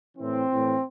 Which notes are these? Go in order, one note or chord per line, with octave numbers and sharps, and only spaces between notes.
A2 E3 C4
A2 E3